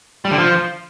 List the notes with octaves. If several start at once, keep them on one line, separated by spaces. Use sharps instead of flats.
G3
D3
F3